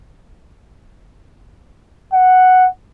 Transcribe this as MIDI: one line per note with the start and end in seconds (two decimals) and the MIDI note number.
2.14 2.68 78